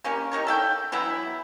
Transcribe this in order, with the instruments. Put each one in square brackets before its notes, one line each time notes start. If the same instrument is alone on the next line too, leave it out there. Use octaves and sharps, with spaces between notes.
[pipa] A#3 C#4 G4
D#4 G4 A#4 C#5
A4 E5 G5
E3 F#3 B3 E4